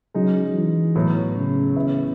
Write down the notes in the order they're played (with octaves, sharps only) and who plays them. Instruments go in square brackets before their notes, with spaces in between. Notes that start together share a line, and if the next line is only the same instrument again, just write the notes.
[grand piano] C#3 G#3 D#4 [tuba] F#3
[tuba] E3
[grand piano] A2 F#3 B3
[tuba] C#3
[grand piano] A2 E3 B3 E4